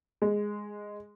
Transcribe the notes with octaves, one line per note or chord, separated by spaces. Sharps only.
G#3